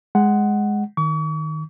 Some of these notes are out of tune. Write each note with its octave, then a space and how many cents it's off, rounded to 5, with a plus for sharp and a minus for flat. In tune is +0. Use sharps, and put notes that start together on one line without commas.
G#3 +0 F#5 +10
D#3 +0 C#6 +40